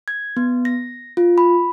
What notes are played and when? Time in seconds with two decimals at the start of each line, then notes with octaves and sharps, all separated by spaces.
0.08 G#6
0.37 B3
0.65 A#6
1.17 F4
1.38 B5